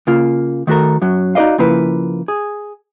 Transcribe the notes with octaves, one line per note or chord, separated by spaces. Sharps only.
C#3 A#3 F4
D#3 A3 F#4 A4 A#4
F#2 F#3
D#4 F#4 A#4 D5 D#5 F5
C#3 F3 A#3 E4 B4
G#4